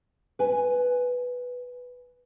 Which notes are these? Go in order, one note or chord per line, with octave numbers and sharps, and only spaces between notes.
B4 G#5